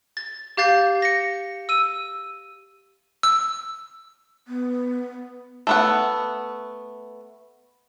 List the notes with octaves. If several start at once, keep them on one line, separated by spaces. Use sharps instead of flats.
A6
G4 F5 G6 A6 C7
A#6 C#7
E6 D#7
E6
B3
A3 B3 F#5